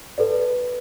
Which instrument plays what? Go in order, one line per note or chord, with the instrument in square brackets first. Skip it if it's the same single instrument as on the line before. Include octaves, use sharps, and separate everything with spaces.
[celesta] A4 B4 D5